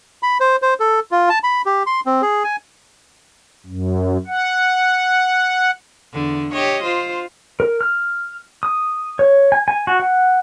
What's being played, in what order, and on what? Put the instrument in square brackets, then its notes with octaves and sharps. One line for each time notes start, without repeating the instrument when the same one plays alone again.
[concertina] B5
C5
C5
A4
F4
A5
B5
G4
C6
C4
G#4
G#5
[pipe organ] F#2
F#5
[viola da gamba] E2 D3
G4 C#5 D#5
F4 C5
[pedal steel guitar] A#4
F6
D#6
C#5
G#5
G#5
F#4
F#5